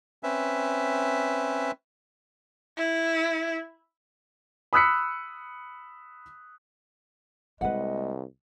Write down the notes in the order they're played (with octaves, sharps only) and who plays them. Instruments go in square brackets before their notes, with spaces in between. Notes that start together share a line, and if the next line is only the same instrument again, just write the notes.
[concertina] C4 C#4 B4 E5
[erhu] E4
[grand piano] B5 D#6 E6 F#6 B6 C#7
[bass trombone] C2 [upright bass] G#3 A#3 [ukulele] B4 F#5 [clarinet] D#5